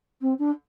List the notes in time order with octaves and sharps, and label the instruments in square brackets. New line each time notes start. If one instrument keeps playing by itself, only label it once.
[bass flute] C4
D4